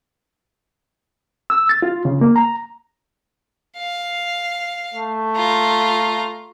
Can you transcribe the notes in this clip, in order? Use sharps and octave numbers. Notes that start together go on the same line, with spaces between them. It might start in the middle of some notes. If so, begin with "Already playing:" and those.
E6
A6
F4
C#3
A#3
A#5
F5
A3
F4 A#5